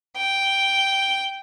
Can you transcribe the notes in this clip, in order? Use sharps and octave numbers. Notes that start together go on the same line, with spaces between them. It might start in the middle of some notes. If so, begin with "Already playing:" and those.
G5